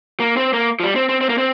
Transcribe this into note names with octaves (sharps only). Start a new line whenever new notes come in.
A#3
C4
A#3
F3
G3
C4
C4
C4
A#3
C4